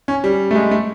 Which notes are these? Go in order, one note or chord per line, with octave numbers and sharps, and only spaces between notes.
C#4
G3
A3
G#3
A3